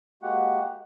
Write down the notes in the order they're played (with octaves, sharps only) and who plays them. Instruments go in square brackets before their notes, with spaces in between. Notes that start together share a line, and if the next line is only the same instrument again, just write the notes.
[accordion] G#3 A#3 F#4 G4 F#5